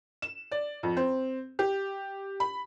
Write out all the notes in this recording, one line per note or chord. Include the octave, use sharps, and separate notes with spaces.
E7
D5
F2
C4
G4
B5